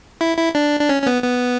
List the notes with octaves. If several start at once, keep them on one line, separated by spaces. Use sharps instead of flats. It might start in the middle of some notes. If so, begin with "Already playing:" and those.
E4
E4
D4
D4
C#4
C#4
B3
B3